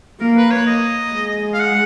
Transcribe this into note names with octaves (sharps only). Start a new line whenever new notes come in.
A#3 A#4
B4
C#5
D#5
G#3
F5
F#5